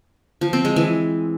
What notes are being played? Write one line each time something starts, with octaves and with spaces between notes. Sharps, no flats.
F3
C4
G#3
E3